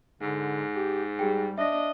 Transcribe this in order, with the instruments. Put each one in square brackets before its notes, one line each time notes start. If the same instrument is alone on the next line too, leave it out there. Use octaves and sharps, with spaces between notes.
[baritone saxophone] G#2 [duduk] D3
[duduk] G4
[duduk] G3 [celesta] G4 G#4 G5
[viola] D4 D#5 [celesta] E5 A#6